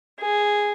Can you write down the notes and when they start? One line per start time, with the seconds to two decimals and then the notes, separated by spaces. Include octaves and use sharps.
0.21 G#4